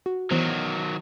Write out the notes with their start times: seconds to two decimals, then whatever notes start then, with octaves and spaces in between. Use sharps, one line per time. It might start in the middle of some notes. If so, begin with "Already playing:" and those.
0.06 F#4
0.31 D#3 E3 F#3 B3 C5